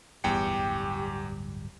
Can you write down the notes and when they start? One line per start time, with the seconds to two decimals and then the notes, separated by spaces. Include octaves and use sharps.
0.24 D1 G1 E2 G3 G4 G5 C#7